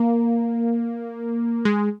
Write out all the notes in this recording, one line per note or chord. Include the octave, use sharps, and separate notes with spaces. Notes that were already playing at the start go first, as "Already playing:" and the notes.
Already playing: A#3
G#3